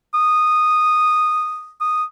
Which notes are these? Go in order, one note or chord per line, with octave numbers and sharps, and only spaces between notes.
D#6
D#6